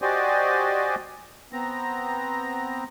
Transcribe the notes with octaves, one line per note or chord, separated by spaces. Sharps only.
F#4 G4 C5 D5 D#5 G#5
B3 C4 A#5